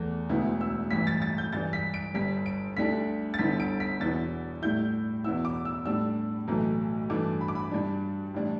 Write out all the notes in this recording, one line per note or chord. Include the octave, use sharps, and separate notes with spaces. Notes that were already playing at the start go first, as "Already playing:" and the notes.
Already playing: E2 E3 A3
E1 D2 D3 B3 E4
E6
A1 G2 E3 B6
A6
A6
G6
G2 E3 G3 A6
B6
D7
G1 G2 G3 B6
D7
D2 D3 G3 D4 B6
A6
G1 G2 D3 B3 E4 B6
D7
B6
E2 B2 B3 E4 A6
A2 G3 E4 G6
E2 B2 B3 E4 E6
D6
E6
A2 G3 D4 E6
B1 A2 E3 A3
G2 E3 A3 D4 D6
B5
D6
B5
G2 G3 D4
A1 G3 D4